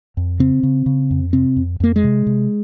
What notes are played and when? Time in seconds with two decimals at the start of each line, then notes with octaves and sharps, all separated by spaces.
0.17 F2
0.39 C#3 C4
0.63 C#3
0.86 C#3
1.11 F2
1.33 C3 C4
1.57 F2
1.80 F2 A#3
1.96 G#3
2.04 C3
2.27 C3